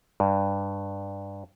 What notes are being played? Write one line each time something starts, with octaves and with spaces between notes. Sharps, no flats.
G2